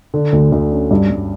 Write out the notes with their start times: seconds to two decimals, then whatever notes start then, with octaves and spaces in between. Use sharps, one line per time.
0.14 D3
0.32 D2
0.52 D2
0.72 C#4
0.91 G2
1.10 G2